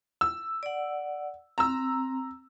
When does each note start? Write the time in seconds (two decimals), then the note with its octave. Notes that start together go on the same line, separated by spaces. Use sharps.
0.21 E6
0.63 D5 F#5
1.58 C4 A#5 E6